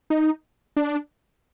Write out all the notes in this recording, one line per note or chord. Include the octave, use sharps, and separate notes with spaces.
D#4
D4